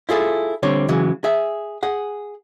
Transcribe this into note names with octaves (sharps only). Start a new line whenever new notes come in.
E4 F4 G#4 A4
D3 G3 C4 C#5
C#3 E3 F#3 G#3
G#4 E5
G#4 F#5